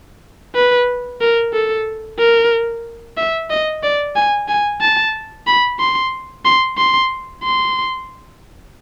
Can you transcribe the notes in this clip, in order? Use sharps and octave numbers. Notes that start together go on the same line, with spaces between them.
B4
A#4
A4
A#4
E5
D#5
D5
G#5
G#5
A5
B5
C6
C6
C6
C6